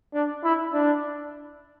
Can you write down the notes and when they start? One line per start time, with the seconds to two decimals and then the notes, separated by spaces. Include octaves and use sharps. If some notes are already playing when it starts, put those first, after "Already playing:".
0.14 D4
0.44 E4
0.73 D4